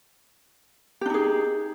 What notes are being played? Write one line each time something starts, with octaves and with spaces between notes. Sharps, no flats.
D4 D#4 G4 G#4